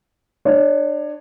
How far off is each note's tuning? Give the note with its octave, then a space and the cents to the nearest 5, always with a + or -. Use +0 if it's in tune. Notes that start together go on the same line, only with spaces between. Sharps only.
D4 +25 C#5 +0